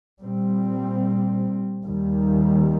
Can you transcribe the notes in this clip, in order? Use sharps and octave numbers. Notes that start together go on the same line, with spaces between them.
A#2 G3 C4
D#2 D#3 G3